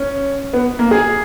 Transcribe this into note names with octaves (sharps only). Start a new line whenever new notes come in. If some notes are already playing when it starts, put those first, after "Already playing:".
Already playing: C#4
B3
A#3
G#4